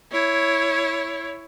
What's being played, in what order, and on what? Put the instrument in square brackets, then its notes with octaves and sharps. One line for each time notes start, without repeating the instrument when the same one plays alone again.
[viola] E4 C#5